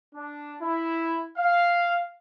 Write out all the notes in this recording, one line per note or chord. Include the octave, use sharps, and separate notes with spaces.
D4
E4
F5